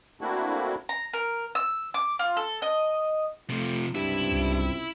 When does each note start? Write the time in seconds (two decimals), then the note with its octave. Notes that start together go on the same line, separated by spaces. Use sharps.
0.21 A3 A#3 C4 D4 E4 F#4
0.89 A#5
1.13 A#4
1.55 E6
1.94 D6
2.19 F4
2.37 A4
2.62 D#5
3.50 C3 F3 A3 F4
3.95 C#2 G2 C3 C4 E4
4.32 C2